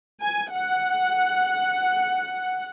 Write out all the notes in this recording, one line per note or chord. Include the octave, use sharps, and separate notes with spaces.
G#5
F#5